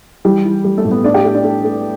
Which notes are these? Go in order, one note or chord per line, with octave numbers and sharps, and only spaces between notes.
E3 G3 G4
E3
G3 A3 G4
A3 A4
A2
B3 B4
A3 D4 D5
G4 G5
A3
D4 D5
A3
A3